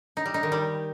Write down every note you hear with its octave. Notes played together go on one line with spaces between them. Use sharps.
D#4
G3
D#4
D#3
G3